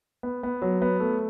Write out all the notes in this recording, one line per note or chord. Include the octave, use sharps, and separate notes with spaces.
B3
B3
F#3
B3
A3